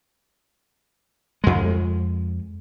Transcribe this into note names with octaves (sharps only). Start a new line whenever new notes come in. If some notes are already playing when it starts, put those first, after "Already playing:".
F2 G#3